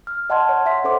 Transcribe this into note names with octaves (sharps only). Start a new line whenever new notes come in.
F6
D#5 F#5 A5 C6 F6 G#6
C#5
E5 F#5 C6 B6
C#4 A4 C5 E5 C6 D6